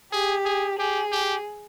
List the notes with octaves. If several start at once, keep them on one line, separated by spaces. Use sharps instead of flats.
G4 G#4
G#4
G4 G#4
G4